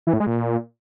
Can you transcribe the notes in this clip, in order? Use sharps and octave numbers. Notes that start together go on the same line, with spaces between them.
E3
A2
G#3
A#2